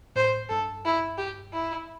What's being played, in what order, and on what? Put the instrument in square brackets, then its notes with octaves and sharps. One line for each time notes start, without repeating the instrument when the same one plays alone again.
[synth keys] A2 [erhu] C5
[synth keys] G2 [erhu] A4
[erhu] E4
G4
E4